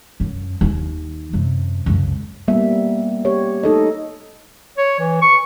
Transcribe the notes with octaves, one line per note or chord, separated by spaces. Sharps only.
F#2
D#2 D#3
F#2 C3
C#2 F#2
G3 A#3 B3 E5
G4 C#5
D#4 A4 D#5
C#5
E3
C#6